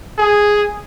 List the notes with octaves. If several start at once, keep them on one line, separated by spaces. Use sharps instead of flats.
G#4